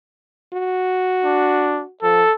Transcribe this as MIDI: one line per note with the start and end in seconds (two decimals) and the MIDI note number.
0.53 1.92 66
1.24 1.83 62
2.03 2.23 53
2.03 2.34 69